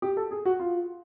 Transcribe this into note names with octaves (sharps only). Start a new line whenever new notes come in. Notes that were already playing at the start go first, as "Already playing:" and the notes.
G4
A4
G#4
F#4
F4